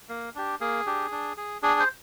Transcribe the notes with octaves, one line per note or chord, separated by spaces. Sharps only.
A#3
D4 G4
A#3 G#4
D4 G4
D4
G#4
D4 G#4
C5